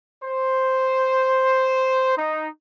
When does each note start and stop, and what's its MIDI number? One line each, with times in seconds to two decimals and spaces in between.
0.24 2.15 72
2.18 2.48 63